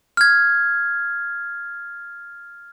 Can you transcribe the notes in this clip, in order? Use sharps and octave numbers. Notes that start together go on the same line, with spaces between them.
F6 G#6